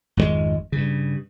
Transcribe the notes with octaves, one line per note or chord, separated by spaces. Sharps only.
G#1 F2 B2 G#3
G2 C#3